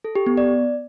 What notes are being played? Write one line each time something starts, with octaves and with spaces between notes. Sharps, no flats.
A4
G4
B3
D5